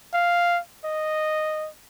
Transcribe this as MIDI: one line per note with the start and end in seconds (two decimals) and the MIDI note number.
0.13 0.59 77
0.85 1.69 75